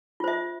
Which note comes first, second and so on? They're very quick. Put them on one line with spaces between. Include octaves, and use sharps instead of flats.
F4 C5 E5